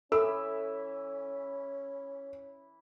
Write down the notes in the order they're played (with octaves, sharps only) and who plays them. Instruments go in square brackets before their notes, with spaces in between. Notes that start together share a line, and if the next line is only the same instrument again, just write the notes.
[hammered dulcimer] E3 E4 B4 [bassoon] C#4 [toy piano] A4 [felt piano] E6